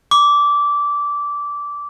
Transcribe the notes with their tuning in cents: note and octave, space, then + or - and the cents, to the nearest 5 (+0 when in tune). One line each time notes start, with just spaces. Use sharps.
D6 -15